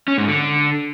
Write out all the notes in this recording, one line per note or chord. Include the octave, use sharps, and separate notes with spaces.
C#4
G#2
D3